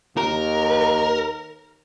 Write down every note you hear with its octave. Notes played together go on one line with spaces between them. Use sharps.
D#2 A#4